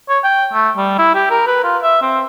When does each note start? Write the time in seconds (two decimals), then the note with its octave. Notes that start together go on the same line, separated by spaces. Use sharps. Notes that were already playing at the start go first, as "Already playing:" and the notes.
0.09 C#5
0.24 G5
0.53 A3
0.77 G3
0.99 E4
1.15 G4
1.30 A#4
1.47 B4
1.64 F4
1.83 E5
2.02 C4